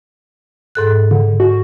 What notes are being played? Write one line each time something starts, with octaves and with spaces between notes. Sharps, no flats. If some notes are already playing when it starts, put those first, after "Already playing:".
G#2 A4 F#6
D3
F#4